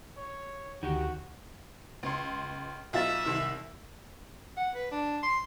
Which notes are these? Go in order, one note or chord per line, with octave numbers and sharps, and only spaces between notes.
C#5
D2 D#3 F#4 G4
C#2 C6
B1 F4 E5 A6
C2 D#3 E6
F#5
B4
D4
C6